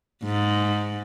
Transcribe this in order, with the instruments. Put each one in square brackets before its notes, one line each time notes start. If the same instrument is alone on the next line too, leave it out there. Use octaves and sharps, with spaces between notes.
[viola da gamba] G#2